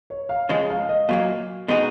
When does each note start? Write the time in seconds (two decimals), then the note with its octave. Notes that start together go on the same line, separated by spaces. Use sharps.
0.10 C#5
0.29 F5
0.49 C#3 F3 G#3 D#5
0.70 F5
0.89 D#5
1.09 A#2 F#3 A#3 F5
1.68 B2 G#3 D#4 F#4